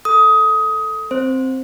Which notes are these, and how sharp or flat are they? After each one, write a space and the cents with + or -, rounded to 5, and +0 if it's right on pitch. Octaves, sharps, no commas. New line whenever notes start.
A4 +0 D#6 +20
C4 +0 C5 +0